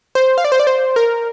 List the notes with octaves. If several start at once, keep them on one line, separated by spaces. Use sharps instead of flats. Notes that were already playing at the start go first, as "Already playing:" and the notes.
C5
F5
D5
C5
D5
C5
A#4